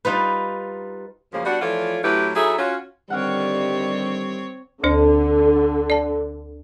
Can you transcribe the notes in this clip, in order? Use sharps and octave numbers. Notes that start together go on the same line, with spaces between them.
G3 D#4 F4 B4
F#2 C#3 F3 G#3 A#3
G3 B3 D4 F#4
E3 F3 A3 F4 C#5 D5
A2 F#3 C#4 E4 G4 B4
F#3 D#4 E4 G#4 A4 E5
C#4 F4 F#4
D3 D#3 G3 C4 C#5 F#5 F6 D7
D2 D3 D4 C5
D5 A5